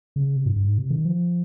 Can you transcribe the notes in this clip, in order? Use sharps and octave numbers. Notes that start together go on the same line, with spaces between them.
C#3
C3
G2
G2
G#2
C3
D#3
F3